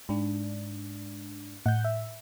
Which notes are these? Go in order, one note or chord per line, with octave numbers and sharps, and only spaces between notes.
G#2 D4
A2 F#5 G6
E5